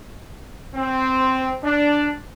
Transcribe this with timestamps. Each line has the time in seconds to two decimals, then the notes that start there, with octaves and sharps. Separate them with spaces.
0.75 C4
1.63 D4